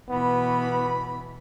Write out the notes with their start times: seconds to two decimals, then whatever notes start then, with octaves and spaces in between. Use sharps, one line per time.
0.10 B2 E3 B3 B5